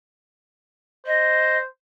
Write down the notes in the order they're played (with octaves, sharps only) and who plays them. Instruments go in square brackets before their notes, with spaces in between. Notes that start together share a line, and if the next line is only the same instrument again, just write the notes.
[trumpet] C5 [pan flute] D#5